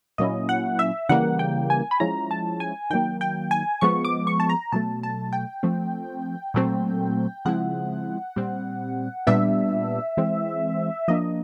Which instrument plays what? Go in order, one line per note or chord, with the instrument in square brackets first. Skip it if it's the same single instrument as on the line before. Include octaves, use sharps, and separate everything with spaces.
[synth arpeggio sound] A#2 F#3 A#3 C#4 E4 D#5
F#5
E5
C#3 E3 G3 A#3 F#5
G5
G#5
B5
F3 G#3 C#4 E4 A#5
A5
G#5
D#3 F#3 A#3 G5
G5
G#5
F3 G#3 B3 C#6
D6
C#6
A5
A#5
B2 F#3 A3 A5
A5
G5
F3 A3 C4
A#2 F#3 A3 C4
C#3 F3 G#3 C4 E4 F#5
A#2 G3 C4
A#2 G3 B3 D4 E5
E3 G#3 C4
F3 A#3 D4 D#5